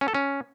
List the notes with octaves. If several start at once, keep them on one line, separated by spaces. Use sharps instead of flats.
C#4
A4
C#4